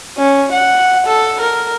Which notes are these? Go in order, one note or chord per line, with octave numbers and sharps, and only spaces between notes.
C#4
F#5
A4
A#4